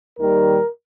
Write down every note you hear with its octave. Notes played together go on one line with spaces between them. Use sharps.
D#2 D#3 G3 A#4